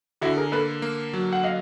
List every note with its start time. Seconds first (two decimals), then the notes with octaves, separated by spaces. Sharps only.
0.21 D3 E4 F#4
0.37 G#4 A#4
0.52 A#3 A4 B4
0.82 A#3
1.13 F#3
1.33 F#5
1.44 D#5 F5